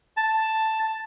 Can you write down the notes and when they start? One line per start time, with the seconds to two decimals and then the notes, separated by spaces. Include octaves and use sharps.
0.17 A5